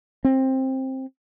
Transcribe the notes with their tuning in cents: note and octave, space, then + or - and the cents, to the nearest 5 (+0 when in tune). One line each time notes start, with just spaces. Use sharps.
C4 +15